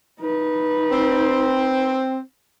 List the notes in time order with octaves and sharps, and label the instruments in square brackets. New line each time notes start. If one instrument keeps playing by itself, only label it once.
[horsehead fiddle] D#4 B4
[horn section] C4